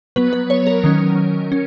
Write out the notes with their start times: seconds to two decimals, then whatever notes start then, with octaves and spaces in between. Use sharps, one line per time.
0.16 F#3 B3 B4
0.33 B4
0.50 C#5
0.67 A#4
0.84 D#3 F#3 C#4
1.52 C#4